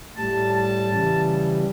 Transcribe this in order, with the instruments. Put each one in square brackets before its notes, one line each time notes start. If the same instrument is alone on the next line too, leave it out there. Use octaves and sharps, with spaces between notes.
[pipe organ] A2 G3 A5
A5
C#3 E3 G3